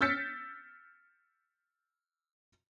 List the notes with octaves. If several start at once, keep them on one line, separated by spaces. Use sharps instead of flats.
E6 F6 G6 A6 B6 C#7